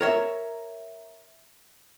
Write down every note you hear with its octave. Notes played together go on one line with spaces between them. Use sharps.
A#4 C#5 E5